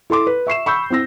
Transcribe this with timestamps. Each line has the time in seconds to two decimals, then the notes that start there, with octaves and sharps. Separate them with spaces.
0.10 E4 A4 C6 D6
0.27 B4
0.47 E5 C#6 C7 E7
0.66 B5 C#6 E6 G6
0.90 C4 E4 E6 A#6